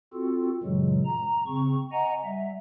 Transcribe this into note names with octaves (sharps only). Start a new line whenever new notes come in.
C4 F4 F#4 A4
F#2 A#2 C#3 E3 F#3 G#3
A#5
C#3 C4 C#6
D#5 F#5 G#5 A#5
G3 E5